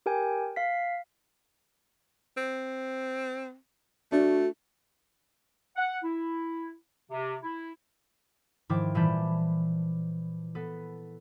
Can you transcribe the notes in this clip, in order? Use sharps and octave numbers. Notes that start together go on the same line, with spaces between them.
G4 A#4 G5 G#5
F5 B6
C4
A3 D4 F#4
F#5
E4
C3
E4
G#2 D#3 F3 E4 G5 D6
A#2 E3 G3 A5 B5 G6
B3 A4